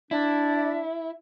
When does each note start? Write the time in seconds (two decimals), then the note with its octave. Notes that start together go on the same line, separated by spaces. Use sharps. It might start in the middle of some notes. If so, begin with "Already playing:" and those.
0.11 D4 E4